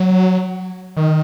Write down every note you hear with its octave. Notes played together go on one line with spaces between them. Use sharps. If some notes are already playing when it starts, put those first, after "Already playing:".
Already playing: F#3
D#3